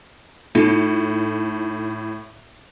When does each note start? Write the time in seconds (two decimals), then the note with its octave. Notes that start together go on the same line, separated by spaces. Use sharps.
0.55 A2 D#4 F4 A4